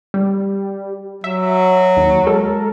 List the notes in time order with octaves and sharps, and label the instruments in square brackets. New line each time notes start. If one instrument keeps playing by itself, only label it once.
[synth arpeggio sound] G3
[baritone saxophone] F#3 [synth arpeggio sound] E5
[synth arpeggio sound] D#2
G#3 A4 A#4